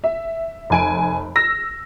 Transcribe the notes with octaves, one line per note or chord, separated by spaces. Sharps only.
E5
F1 G#5 D7
E6 A#6